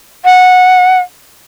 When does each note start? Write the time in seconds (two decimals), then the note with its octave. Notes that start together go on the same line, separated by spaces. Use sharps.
0.25 F#5